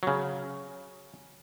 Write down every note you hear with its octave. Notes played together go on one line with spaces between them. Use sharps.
C#3 F#3